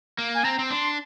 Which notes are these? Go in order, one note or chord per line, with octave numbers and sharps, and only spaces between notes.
A#3
G#5
C4 A#5
C4
D4 C6